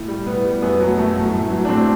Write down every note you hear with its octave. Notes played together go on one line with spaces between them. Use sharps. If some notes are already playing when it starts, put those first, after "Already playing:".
Already playing: A2
G3
A2 B3
G3
F#2 B3
F#3 A3
F#2 A3
F#3 A3
A2
F#3 A3
D4
A2 A3 C4